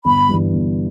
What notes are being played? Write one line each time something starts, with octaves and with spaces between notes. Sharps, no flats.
G1 B5
G2 E3 G3
G1